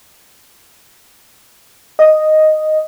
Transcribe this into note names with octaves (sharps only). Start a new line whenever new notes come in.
D#5